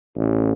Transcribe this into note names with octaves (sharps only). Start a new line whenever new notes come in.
A1